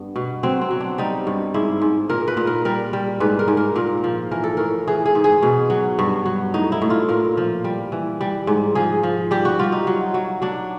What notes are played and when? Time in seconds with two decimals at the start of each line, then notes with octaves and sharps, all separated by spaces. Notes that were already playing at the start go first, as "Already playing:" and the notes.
Already playing: G2 B3
0.16 B2
0.43 F#3 C4
0.61 C4
0.70 F#3
0.80 D4
0.98 G3 D#4
1.27 G2
1.54 G#2 E4
1.81 G#2
2.10 A#2 A#4
2.28 B4
2.37 A#2
2.47 A#4
2.65 G3 A#4
2.93 G3
3.20 G#2 B4
3.39 A#4
3.48 G#2
3.57 A#4
3.75 A#2 A#4
4.04 F3
4.31 E3 A#4
4.44 A4
4.57 A2 A#4
4.87 E3 G#4
5.06 G#4
5.15 G#2
5.24 G#4
5.43 B2
5.70 F#3
5.99 G2
6.25 F#3
6.54 A2 D#4
6.72 E4
6.82 A2
6.90 F4
7.09 A#2 A#4
7.37 F3
7.64 G3
7.92 E3
8.21 G3
8.47 G#2
8.75 F3 G#4
9.03 F3
9.31 G3 G4
9.45 F#4
9.59 G3 F4
9.72 D#4
9.87 F#3
10.14 F#3
10.42 F#3 D4